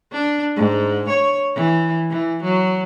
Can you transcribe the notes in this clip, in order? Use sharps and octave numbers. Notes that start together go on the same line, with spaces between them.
D4
G#2
C#5
E3
E3
F#3